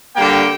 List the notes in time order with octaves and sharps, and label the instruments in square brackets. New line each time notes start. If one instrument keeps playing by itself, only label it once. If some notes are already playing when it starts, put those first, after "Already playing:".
[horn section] D3 G3 A#3 G5